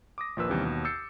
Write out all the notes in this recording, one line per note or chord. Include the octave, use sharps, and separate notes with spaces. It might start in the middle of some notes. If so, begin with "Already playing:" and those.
D6 D#6 A#6
A#1 D#2 F3 A#3 B4 E6
D#2 C3 E3 G3 B3 C#4
D#2 B2
E6 G6 A6 C7 C#7